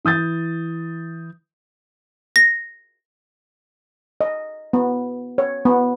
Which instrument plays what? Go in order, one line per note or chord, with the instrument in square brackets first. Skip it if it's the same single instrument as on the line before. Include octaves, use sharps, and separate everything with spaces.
[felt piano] E3 D#6 G6 A6
[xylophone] A#6
[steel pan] D#5
B3
C#5
B3